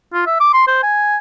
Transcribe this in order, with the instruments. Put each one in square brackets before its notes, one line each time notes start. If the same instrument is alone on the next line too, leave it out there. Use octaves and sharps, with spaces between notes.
[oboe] F4
E5
D6
C6
C5
G#5